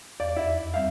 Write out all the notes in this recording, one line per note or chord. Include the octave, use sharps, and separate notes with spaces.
E2 D5
F2 E4
D#2 G3 C4 E5 F5